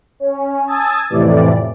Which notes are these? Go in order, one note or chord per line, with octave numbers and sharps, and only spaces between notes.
C#4
G#5 A5 D#6 E6 G#6 A6
F2 A2 C3 E3 D5